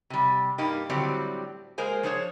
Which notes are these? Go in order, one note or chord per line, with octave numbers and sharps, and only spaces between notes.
C3 G3
G2 A#3 D#4 G4
A2 D3 F#3 G3 C4 G4
G#3 A#3 A#4 C5 G#5
F3 D4 G#4 C5 C#5